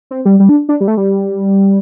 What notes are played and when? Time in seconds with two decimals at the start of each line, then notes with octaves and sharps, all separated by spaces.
0.11 C4
0.25 G3
0.40 G3
0.49 D4
0.69 D4
0.81 G3
0.88 A3
0.97 G3